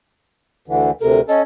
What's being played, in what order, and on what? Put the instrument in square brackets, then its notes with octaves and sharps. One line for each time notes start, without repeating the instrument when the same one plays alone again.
[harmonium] D2 D3 E3
[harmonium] D2 C3 A#4 [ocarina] A4
[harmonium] C#4 A4 [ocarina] D#5